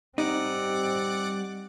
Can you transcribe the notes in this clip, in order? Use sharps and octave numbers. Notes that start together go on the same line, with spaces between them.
G3 C4 D#4 D5 F#5 D6